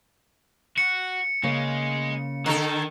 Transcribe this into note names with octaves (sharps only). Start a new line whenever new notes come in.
F#4 C#7
C#3 G#3 A#3
D3 D#3 A4